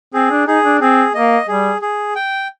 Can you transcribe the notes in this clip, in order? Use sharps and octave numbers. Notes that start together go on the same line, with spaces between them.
C4 G#4
D4
D#4 G#4
D4
C4 G#4
A#3 D#5
G3 G#4
G#4
G5